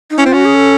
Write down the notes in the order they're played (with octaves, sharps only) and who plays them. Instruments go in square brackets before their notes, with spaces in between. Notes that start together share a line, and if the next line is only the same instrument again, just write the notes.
[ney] D#4
[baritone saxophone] C#4 [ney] E4
[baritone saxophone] C4 [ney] F4
[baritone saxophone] C#4 [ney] F#4
[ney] G#4
A4